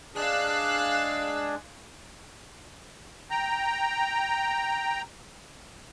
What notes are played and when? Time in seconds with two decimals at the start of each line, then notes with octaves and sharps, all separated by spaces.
0.15 G#3 D4 G#4 F5 E6 F#6
3.30 G5 A#5